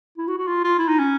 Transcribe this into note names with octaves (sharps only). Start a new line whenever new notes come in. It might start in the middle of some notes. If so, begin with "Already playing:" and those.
E4
F#4
F#4
F4
F4
E4
D#4
C#4